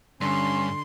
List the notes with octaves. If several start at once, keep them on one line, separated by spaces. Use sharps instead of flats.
G2 D3 C#4 C6